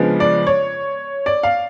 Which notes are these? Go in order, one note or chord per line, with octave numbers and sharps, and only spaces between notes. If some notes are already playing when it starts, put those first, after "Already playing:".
Already playing: C#3 F3 G#3 B3 D4
D5
C#5
D5
F5